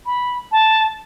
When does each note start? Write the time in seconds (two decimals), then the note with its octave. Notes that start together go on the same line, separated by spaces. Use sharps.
0.06 B5
0.52 A5